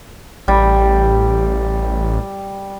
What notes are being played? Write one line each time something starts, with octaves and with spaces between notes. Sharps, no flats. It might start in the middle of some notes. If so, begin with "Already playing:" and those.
A1 G3